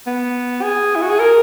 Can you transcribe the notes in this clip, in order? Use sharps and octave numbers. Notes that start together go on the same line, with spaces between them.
B3
G#4
E4
F#4
G#4
A#4